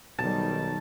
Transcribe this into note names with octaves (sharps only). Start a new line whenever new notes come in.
B1 D#3 G3 A5